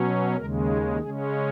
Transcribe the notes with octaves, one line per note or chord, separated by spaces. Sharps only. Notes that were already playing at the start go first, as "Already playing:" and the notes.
Already playing: B2 F#3 C#4
D#2 C#3 G#3 A#4
G#4
C#3 G#3 C#4 G#4